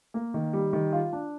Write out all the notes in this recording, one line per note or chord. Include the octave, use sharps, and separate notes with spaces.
A#3
D#3
G3
D#3
F4
D4